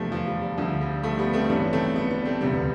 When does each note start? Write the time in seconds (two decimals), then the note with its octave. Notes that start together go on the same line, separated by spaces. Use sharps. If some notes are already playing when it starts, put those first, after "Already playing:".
Already playing: F1 E2 D3 F3 G3 A3 B3
0.12 F3
0.27 G3
0.42 G3
0.58 D2 D3 F3
0.81 G3
1.03 F3 A3
1.19 G3 B3
1.33 A3 C4
1.49 A1 G2 E3 B3 D4
1.73 A3 C4
1.95 G3 B3
2.11 B3 D4
2.25 A3 C4
2.41 E1 D2 C3 G3 B3